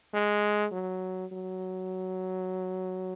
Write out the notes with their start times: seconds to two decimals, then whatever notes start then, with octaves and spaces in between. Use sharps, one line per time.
0.14 G#3
0.72 F#3
1.32 F#3